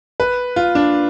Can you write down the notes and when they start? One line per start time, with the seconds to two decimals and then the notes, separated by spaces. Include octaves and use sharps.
0.20 B4
0.56 F4
0.75 D4